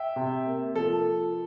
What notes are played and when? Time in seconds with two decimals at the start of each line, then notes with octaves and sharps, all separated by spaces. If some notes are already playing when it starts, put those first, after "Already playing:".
Already playing: E5 G5
0.16 C3
0.46 A#3
0.75 F3 A4